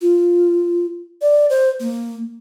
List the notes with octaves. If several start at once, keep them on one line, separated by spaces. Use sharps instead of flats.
F4
D5
C5
A#3